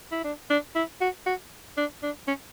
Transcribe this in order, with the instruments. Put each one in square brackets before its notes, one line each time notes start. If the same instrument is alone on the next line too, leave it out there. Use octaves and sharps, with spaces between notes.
[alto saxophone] E4
D4
D4
E4
F#4
F#4
D4
D4
C#4